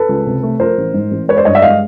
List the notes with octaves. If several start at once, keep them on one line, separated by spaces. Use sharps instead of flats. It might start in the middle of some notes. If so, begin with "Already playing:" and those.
Already playing: A4 B4
C#2
C3
A3
F3 A#4 C5
A1
G#2
A1
G#3 B4 C#5
C5 D5
G2 C#5 D#5
D5 E5
G#3 D#5 F5